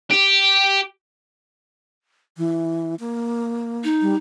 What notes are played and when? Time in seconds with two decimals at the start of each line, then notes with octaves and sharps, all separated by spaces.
0.11 G4
2.38 E3
3.00 A#3
3.84 D#4
4.01 G3